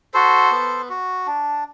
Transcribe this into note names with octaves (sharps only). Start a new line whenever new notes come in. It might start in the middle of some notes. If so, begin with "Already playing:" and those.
F#4 A4 C5
B3
F#4
D4